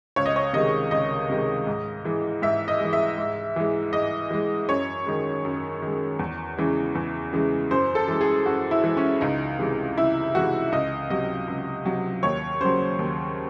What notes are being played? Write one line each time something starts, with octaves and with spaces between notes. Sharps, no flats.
C#2 C#5
D#5
C#5
C3 D#3 G#3 D#5
C#2 D#5
C3 D#3 G#3
G#2
E3 G#3
G#2 E5
D#5
E3 G#3
E5
G#2
E3 G#3
G#2 D#5
E3 G#3
F#2 C#5
D#3 G#3
F#2
D#3 G#3
E2
C#3 E3 G#3
E2
C#3 E3 G#3
F#2 C5
A4
E3 G#3
G#4
F#2 F#4
E4
E3 G#3
C#4
C#2 D#4
C3 E3 G#3
C#2 E4
C3 E3 G#3 F#4
C#2 D#5
C3 F#3 D#5
C#2
C3 F#3
D#2 C#5
C#3 F#3 C5
D#2